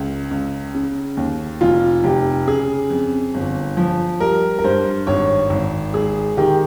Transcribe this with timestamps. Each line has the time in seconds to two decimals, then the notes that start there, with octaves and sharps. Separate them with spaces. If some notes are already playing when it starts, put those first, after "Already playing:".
Already playing: C#2
0.31 C#2
0.75 C#3
1.17 D#2
1.61 F1 F4
2.04 F1 G4
2.47 C#3 G#4
2.90 F2
3.34 G1
3.77 F3
4.20 G3 A#4
4.59 A#4
4.64 G2 C5
5.07 G#1 C#5
5.50 G#1
5.94 G#3 G#4
6.37 D#3 G4